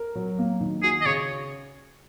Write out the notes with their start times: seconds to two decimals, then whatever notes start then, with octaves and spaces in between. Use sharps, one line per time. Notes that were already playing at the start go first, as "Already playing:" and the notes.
Already playing: A#4
0.15 F#3
0.39 A#3
0.61 D#3
0.83 F#4 G#4
1.01 D#5
1.05 C#3 C#5